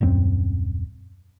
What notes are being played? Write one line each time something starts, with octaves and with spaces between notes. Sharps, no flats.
D#1 F#2 G#3 C4